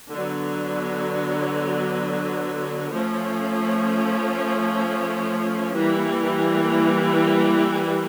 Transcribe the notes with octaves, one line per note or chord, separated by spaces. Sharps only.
D3 F#3 B3
F3 A3 C#4
E3 G3 A#3